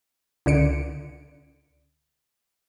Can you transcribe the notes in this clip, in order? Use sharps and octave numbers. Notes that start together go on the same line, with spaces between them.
C#2 D3 C#7 D7